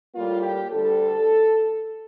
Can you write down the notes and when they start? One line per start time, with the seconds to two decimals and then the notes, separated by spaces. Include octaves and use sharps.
0.14 A2 G3 A#3 F4
0.43 G4
0.71 D2 D3 G3 A4